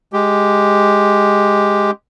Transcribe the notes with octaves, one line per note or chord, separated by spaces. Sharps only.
G#3 G4